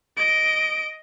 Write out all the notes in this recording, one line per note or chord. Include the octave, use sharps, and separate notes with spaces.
D#5 D7